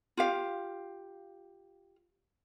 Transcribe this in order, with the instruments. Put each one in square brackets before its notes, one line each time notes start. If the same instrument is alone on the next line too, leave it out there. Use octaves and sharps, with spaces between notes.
[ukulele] F4 G4 F5